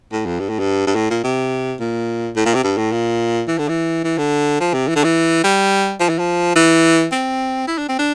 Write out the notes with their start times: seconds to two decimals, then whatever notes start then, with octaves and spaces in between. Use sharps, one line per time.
0.12 A2
0.26 F2
0.40 G2
0.49 A2
0.59 G2
0.87 G2
0.95 A2
1.10 A#2
1.24 C3
1.80 A#2
2.36 A2
2.45 A#2
2.55 C3
2.64 G2
2.78 A2
2.92 A#2
3.48 E3
3.59 D3
3.68 E3
4.04 E3
4.18 D3
4.60 F3
4.74 C3
4.88 E3
4.96 D3
5.04 E3
5.44 G3
6.00 F3
6.09 E3
6.18 F3
6.56 E3
7.12 C4
7.68 E4
7.78 D4
7.88 C4
7.99 D4